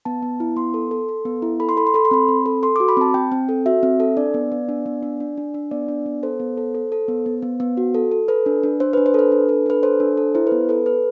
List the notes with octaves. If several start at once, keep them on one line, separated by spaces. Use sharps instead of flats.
B3 A5
B3
E4
B3 C6
A4
A4
A4
B3
E4
A4 B5
C6
A4 B5
C6
A4 B5
C6
C4 B5
C4
A4
A4 C6
F#4 D6
B5
C4 A5
C4 G5
C4
A4
F#4 E5
C4
A4
D4 D5
B3
B3
D4
B3
D4
D4
D4
D4
B3 D5
D4
B3
A4 C5
B3
A4
A4
A4
B3
B3
B3
B3
F#4
A4
A4
A4 B4
D4
D4
D4 C5
D4 B4
C5
A4 B4
D4
A4
D4 B4
A4 C5
D4
A4
E4 C5
B3 B4
A4 B4
A4 B4